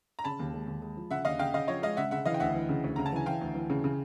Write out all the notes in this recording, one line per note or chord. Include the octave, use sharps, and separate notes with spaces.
A#5
C#3 A5 B5
D#2
G#3
D#2
G#3
F3
C#3 E5 F#5
D#2 D#5 F5
C#3 F5 G5
C#3 D#5 F5
F3 C#5 D#5
G#3 D#5 F5
C#3 E5 F#5
C#3 E5 F#5
E3 D#5 F5
G5
D2 E5 F#5
E3
C#3
D2
C#3 A#5
A5
E3 G#5
E3 F5 G5
D2
E3
C#3
C#3